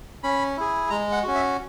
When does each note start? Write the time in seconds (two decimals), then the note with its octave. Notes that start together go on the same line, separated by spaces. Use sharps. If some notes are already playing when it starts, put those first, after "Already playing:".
0.23 C#4 B5
0.57 E4 G#4
0.90 G#3 A#5
1.12 F#5
1.23 C#4 F#4
1.35 E5